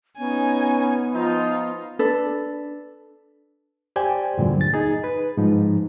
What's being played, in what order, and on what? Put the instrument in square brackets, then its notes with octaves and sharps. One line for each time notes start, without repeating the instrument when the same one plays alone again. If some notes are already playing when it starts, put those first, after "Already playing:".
[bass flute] B3 [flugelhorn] C#4 [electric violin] D#4 G#5
[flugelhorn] F3 [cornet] D#4 [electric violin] F4
[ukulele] D4 A4 B4
[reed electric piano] G4 C5 D5 G5 G#5
E2 G2 A#2 D3 F#3
D2 A6
D#4 G#4
B4
G#2 F3 D#4